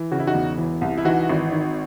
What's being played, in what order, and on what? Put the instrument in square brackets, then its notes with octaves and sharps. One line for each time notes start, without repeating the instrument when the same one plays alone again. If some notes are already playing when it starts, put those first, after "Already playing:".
Already playing: [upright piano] E3
C#3 F#4
E4
D#4 F#4
E1
E3
C2
E4
E3 D#4 F#4
G#1
D#3